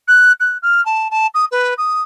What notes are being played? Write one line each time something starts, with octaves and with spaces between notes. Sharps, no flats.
F#6
F#6
F6
A5
A5
D#6
B4
D#6